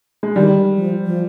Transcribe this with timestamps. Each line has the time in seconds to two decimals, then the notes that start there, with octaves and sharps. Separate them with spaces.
0.23 G#3
0.36 D#3 G3
0.76 F3
1.06 F3